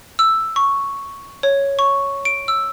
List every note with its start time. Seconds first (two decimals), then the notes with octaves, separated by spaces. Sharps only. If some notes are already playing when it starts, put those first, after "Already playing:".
0.19 E6
0.56 C#6
1.43 C#5
1.79 C#6
2.25 D7
2.48 E6